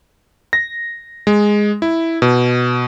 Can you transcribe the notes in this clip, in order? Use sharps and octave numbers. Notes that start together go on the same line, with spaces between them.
A#6
G#3
E4
B2